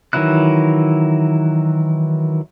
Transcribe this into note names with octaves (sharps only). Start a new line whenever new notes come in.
D#3 E3 F#3 E4 F#6